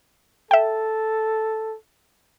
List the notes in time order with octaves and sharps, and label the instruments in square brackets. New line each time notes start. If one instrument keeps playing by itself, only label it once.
[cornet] A4 [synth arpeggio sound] E5 G5